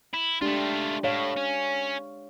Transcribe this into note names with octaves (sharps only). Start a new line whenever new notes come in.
E4
G#3 A3 D4 F4 G4
A2 C#5 F5
C#4